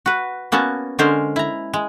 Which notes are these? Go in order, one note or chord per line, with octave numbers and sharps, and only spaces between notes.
F#4 B4
A#3 B3 C#4 F#4 A5
D3 G#3 C#4 A#4 C5
E4 A#5
G#3